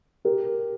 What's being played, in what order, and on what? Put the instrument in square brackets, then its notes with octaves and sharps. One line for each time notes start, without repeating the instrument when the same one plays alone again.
[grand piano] G4 A#4